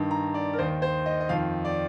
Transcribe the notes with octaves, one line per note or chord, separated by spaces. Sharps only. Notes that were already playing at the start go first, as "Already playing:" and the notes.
Already playing: G2 D#3
A#5
D5
A#4
D#2 D#3 C5
C5
D#5
D#5
F2 D#3 F5
D5